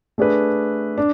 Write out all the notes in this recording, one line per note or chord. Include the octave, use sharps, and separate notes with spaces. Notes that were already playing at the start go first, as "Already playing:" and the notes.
A3 D4 G#4 B4
D4